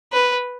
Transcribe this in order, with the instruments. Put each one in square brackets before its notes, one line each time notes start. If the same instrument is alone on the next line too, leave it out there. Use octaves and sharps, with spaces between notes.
[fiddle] B4